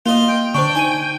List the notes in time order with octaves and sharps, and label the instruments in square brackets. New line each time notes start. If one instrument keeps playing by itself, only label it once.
[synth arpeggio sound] A#3 [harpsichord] F4 D#5 [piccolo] G7
[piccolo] G5
[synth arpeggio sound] D3 C5 [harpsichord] D4 [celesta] C#6
[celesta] D#4 D#7 [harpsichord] G#5